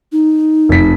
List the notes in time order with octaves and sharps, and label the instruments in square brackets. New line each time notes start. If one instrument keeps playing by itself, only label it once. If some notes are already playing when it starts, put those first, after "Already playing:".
[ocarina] D#4
[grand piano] F1 B6